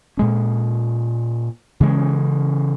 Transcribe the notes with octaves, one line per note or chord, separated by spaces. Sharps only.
A#2 G#3 C#4
C#3 E3 G#3 C#4